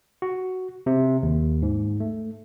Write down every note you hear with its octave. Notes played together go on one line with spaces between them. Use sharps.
F#4
C3
D#2
G#2
A3